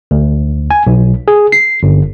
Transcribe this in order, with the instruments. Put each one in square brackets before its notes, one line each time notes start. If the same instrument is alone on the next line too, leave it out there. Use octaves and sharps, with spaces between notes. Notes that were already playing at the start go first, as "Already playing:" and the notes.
[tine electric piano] D2
G#5
B1
G#4
C7
G1